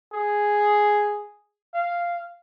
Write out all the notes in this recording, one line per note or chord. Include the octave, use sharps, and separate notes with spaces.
G#4
F5